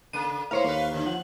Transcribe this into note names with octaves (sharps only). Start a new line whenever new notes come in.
C#3 A#3 D#7
A2 A#3 E4 A#4 C5 C#5 F5
D#2 A#3 B4
D3 D#3
F3 F#5